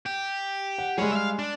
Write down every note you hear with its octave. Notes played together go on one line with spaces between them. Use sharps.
G4
F#5
G3 G#3 G#4 C#5
E5 F5
D4